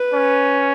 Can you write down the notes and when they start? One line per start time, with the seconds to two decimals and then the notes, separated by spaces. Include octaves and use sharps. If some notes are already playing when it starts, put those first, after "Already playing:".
Already playing: B4
0.14 C#4